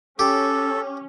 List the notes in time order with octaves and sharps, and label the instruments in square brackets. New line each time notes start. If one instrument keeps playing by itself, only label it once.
[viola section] C#4 [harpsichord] G4 [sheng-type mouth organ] A4